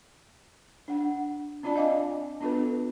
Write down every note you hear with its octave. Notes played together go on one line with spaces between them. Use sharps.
D4 F#5
C4 D4 F4 D5 A5
D#5 F5 G#5 D6
B3 D4 F4 A4 B4